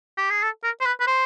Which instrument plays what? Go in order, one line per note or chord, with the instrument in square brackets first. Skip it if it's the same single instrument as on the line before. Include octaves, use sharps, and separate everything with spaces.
[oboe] G4
G#4
A4
A#4
C5
B4
B4
C5